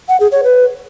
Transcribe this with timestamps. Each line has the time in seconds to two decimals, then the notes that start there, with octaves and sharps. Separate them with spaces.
0.09 F#5
0.20 G#4
0.32 C#5
0.43 B4